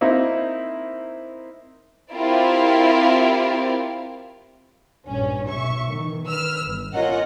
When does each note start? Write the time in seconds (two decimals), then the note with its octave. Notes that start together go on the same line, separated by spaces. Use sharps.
0.01 A#3 C4 D#4 E4 E5
2.12 C4 E4 F4 G4 A#4 D5
5.08 A#1 G2 C#4
5.50 B1 E5 C#6
5.92 D#3 E3
6.27 B4 E6 F6
6.65 G1
6.94 C#4 F4 A#4 C#5 D#5 F#5